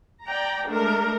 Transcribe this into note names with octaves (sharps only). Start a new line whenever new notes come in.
D5 G5 A#5
G#3 A3 D4 A#4